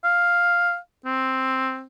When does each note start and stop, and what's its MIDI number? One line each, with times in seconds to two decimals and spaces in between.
0.04 0.77 77
1.05 1.85 60